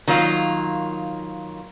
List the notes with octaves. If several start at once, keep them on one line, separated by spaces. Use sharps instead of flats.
D#3 F#3 A#3 F4